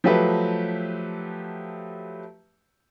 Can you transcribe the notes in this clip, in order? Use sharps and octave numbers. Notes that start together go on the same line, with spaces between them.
F3 F#3 A3 G4 B4 E5